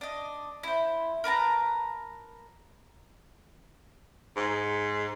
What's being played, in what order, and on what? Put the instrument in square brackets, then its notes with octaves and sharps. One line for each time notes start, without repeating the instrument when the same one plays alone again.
[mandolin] D4 D#5
E4 C5
A#4 B4 A5 A#5
[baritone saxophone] G#2